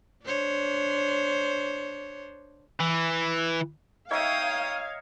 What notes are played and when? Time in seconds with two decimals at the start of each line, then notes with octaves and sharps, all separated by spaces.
0.24 D4 C5 C#5
2.80 E3
4.11 D#4 C#5 E5 F5 G5 D#6 G#6